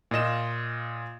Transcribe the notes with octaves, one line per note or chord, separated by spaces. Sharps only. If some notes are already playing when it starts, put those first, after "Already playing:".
A#2 F4 D#5 E7